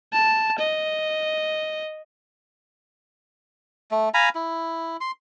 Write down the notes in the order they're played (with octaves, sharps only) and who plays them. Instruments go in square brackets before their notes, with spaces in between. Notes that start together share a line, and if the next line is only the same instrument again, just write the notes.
[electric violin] A5
D#5
[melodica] A3
F5 G#5 A#5 B5
E4
C6